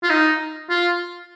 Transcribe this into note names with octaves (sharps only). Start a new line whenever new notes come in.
F4
D#4
F4